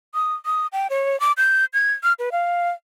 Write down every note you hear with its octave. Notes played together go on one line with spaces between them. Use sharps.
D#6
D#6
G5
C#5
D6
G6
G#6
F6
B4
F5